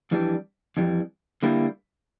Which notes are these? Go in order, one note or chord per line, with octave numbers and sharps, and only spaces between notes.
F2 E3 G3 D4
F2 E3 G3
D3 G3 A#3 E4